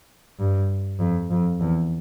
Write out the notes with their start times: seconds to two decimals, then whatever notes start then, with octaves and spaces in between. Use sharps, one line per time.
0.39 G2
1.00 F2
1.30 F2
1.61 E2